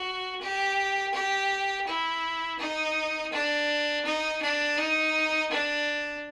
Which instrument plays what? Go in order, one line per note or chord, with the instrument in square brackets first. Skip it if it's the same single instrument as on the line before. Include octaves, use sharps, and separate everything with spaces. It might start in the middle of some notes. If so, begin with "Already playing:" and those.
Already playing: [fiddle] F#4
G4
G4
E4
D#4
D4
D#4
D4
D#4
D4